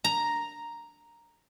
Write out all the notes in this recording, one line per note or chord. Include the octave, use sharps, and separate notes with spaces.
A#5